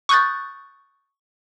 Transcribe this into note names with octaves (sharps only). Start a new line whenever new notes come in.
C#6 D#6 F#6 G6 A6